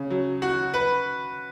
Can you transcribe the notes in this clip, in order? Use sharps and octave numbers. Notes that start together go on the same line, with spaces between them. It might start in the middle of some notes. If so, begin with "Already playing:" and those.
Already playing: C#3
F#3
F#4
B4